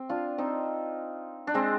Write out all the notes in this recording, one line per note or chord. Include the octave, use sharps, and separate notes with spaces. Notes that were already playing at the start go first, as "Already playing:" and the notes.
Already playing: C4
D4 F4
C4 D#4
D4
G#3 C4